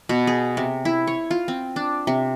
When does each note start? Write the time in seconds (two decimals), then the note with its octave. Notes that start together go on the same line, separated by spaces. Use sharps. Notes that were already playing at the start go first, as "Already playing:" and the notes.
0.09 B2
0.27 G#4
0.57 C3
0.85 E4
1.07 C#5
1.31 F4
1.48 C4
1.76 D4
2.07 C3